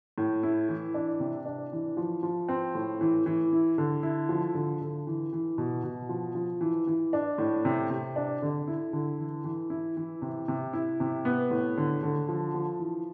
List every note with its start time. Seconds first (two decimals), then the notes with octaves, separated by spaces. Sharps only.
0.18 A2
0.43 E4
0.69 E3
0.94 D4
1.20 C3
1.46 D4
1.72 E3
1.97 F3
2.23 F3
2.49 C4
2.75 A2
3.01 E3
3.26 E3
3.53 E4
3.78 D3
4.03 E4
4.29 F3
4.55 D3
4.81 D3
5.07 E3
5.33 E3
5.58 B2
5.83 B2
6.09 F3
6.35 F3
6.61 E3
6.87 E3
7.13 D4
7.38 A2
7.65 C3
7.90 C3
8.16 D4
8.42 D3
8.68 E4
8.93 D3
9.19 E3
9.44 E3
9.70 E4
9.97 E3
10.22 C3
10.48 C3
10.73 E4
11.00 C3
11.25 B3
11.51 A2
11.77 D3
12.03 D3
12.29 F3
12.54 F3
12.79 E3